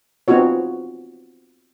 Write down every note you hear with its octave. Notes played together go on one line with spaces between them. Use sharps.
B3 C4 D#4 F4 F#4 C#5